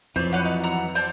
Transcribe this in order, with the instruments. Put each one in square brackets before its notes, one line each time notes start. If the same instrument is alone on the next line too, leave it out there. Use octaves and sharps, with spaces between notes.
[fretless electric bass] F2 [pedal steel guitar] E3 F#3 D5 [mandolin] C5
[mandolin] B4 C#5 F#5
D#4
F#5 A#5 E6
C5 D5 A5